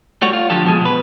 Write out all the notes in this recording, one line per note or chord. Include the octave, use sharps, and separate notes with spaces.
G3 A3 F#4 C#5
F4
D3 F3 G4 A4
B2 F3 G#3
B2 B4